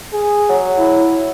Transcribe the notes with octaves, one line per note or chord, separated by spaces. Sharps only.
G#4
F#3
E4